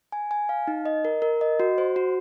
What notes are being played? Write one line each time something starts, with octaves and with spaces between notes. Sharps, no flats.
G#5
G#5
F5
D#4
D#5
A#4
A#4
D#5
F#4
C5
F#4